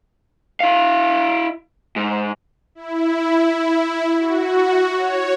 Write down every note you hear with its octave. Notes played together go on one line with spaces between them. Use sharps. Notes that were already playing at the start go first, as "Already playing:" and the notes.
E4 F5
G#2
E4
F#4
C#5